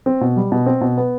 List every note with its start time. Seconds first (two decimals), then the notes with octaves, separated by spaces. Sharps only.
0.06 C4
0.21 B2
0.36 G3
0.52 B2
0.66 C4
0.81 B2
0.97 B3